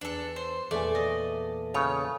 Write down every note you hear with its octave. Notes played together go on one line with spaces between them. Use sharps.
E2 D4 A4
C5
E2 A#2 A3 D5 G#5
D#5
C#3 F4 C#5